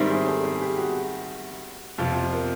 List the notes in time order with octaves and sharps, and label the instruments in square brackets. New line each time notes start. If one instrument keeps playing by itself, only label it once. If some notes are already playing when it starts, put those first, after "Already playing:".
Already playing: [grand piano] G#2 D#3 G3 C4 E4 [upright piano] A#4
[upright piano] G#4
A4
G#4
G4
F#4
[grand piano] F2 C3 F3 [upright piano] F4
[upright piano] F4
A#4